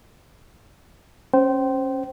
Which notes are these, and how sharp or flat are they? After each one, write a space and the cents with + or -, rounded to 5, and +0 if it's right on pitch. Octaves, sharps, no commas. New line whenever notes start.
C#4 -20 C5 +0 G5 -25